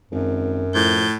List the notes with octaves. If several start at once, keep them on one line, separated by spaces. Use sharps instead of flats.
G#1 F#2
A2 F3 G6